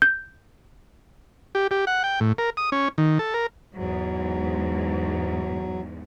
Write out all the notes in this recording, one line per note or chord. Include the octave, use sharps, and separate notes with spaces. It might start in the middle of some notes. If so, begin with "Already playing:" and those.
G6
G4
G4
F#5
G5
A2
A#4
D#6
C#4
D#3
A4
A#4
E2 G#2 F#3